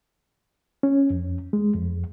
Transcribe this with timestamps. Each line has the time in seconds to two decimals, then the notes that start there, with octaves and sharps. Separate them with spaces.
0.83 C#4
1.10 F2
1.53 G#3
1.75 F2